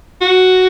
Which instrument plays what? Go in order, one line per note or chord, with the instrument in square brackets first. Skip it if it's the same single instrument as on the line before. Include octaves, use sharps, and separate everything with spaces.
[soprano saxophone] F#4